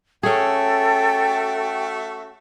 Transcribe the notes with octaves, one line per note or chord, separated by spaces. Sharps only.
A3 C#4 F#4 G#4 A4 E5 G5